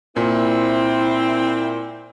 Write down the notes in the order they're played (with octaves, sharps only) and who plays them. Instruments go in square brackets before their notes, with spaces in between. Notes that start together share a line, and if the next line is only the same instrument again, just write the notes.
[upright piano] A#2 [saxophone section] C4 [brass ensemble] E4